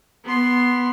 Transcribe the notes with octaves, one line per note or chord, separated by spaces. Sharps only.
B3 C6